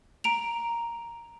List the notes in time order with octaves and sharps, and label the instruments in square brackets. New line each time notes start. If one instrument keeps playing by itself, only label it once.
[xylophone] A#5 D7 F7